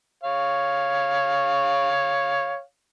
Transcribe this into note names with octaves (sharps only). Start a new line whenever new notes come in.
C#5 F5